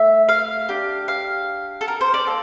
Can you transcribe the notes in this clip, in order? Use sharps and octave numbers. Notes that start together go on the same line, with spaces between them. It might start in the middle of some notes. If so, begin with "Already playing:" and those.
Already playing: A3 E5
F5
D4 G4
F5
A4
A#4
C5
D5
A#3 A4